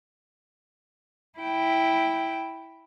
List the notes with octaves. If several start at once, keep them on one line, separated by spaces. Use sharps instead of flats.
E4 G5